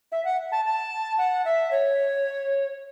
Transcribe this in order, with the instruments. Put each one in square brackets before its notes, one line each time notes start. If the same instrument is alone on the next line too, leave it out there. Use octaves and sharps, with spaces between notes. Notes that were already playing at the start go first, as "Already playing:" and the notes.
[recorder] E5
F#5
A5
A5
F#5
E5
C#5